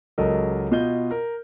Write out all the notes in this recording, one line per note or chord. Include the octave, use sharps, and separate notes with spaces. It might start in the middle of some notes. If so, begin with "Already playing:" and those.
C#2 F#3 A4 A#4 D#5
B2 F4 D#5 G6 G7
A#4